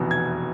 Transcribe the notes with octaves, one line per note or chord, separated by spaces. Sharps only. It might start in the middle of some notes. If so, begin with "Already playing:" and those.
Already playing: F1 E2 B2
G#6